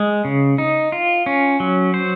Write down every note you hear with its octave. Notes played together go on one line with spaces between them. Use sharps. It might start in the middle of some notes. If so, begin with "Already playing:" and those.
Already playing: G#3
C#3
D#4
F4
C#4
F#3
C5